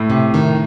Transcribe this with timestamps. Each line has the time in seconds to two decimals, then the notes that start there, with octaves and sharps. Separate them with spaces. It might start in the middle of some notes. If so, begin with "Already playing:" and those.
Already playing: A2
0.10 C3
0.34 D#3